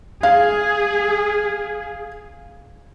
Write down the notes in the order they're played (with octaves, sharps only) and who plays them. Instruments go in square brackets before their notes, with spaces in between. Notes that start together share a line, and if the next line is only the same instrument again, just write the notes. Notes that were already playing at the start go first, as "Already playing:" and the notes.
[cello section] G#4 [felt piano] F5